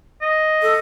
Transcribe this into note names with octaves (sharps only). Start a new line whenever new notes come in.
D#5
A4